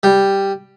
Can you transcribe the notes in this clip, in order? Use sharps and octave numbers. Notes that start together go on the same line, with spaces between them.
G3